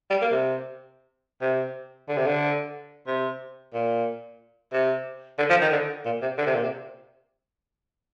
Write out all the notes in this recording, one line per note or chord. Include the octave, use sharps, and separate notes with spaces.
G3
A#3
C3
C3
D3
C3
D3
C3
A#2
C3
D3
F3
D#3
D3
A#2
C3
D3
C3
A#2
C3